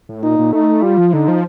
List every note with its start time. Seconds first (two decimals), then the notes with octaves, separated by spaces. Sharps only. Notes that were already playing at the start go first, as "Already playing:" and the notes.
0.09 A2
0.23 A#2 D#4
0.39 A#2
0.53 A3 D#4
0.83 G3 F4
0.98 F3
1.13 D3 D#4
1.28 F3